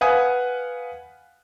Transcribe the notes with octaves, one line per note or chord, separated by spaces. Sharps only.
B4 F5 F#5 G#5 D#6 G#6